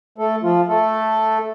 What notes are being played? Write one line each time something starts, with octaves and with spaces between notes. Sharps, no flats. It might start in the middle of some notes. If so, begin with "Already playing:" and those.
A3 A4
F3 F4
A3 A4